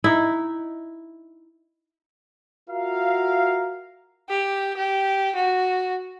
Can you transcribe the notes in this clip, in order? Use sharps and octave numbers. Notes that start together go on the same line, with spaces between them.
D#4 E4
F4 F#4 A#4 E5 F5
G4
G4
F#4